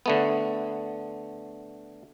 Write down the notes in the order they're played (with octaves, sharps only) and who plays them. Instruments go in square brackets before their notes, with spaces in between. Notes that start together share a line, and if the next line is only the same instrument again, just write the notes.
[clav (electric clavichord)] D3 A3 B3